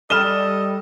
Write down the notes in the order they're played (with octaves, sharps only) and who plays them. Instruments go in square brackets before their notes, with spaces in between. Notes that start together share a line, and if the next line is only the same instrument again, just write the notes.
[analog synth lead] G3 [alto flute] A4 [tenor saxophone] D#5 [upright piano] F6 E7 G7